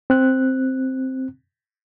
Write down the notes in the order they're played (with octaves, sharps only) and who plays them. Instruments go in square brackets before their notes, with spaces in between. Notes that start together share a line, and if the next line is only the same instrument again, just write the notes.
[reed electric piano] C4 F#6